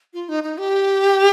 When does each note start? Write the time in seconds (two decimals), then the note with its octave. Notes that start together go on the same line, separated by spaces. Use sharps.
0.14 F4
0.29 D#4
0.44 D#4
0.58 G4